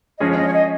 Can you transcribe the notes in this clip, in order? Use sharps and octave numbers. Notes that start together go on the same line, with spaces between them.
F3 G#3 C#4 G#4 D#5
C#5
D#5
C#5
D#5